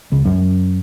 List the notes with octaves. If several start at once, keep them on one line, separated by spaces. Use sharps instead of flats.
C#2
F#2